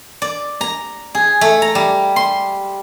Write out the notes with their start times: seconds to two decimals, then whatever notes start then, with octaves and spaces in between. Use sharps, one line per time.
0.22 D5
0.61 A#5
1.15 G#4
1.41 A3
1.62 A#5
1.75 G3
2.16 C6